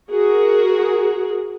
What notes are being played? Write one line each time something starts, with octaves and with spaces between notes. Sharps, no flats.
F#4 G#4 A#4